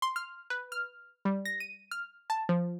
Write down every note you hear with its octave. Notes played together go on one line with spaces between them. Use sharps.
C6
F6
B4
F6
G3
A#6
D#7
F6
A5
F3